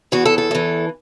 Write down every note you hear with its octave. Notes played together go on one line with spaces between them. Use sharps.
E2 E3 F#4
A4
A4
E2 E3